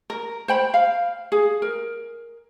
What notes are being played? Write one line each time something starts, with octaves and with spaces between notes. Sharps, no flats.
A#4
C5 G5 B5
F5
G#4
A#4